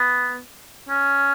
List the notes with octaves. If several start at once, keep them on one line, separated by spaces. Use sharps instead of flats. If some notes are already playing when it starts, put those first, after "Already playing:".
Already playing: B3
C#4